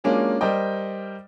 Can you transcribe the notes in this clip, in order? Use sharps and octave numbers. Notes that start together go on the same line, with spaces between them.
F#3 G#3 A#3 C#4 D4 F4
G3 A#4 C5 D5 D#5 G5